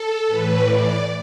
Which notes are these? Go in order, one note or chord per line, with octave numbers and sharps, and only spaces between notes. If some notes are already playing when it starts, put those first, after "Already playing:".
Already playing: A4
A2 E3 B4
D5